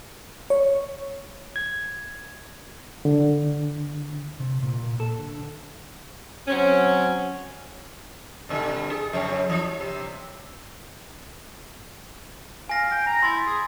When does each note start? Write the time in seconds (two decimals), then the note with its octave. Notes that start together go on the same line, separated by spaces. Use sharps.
0.50 C#5
1.56 G#6
3.05 D3
4.40 C3
4.62 A#2
5.00 A4
5.18 D3
6.48 F#3 C4 C#4
8.49 G2 B2 D3
8.91 G#4
9.13 F2 C#3 C#5
9.49 E3
9.78 G2 C3
12.69 F5 G#5 A#6
12.91 G5
13.06 A#5
13.23 E4 C6 A6
13.47 G#4